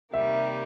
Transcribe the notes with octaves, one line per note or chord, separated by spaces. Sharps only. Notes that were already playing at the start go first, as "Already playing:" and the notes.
C3 D#3 G3 A#3 E5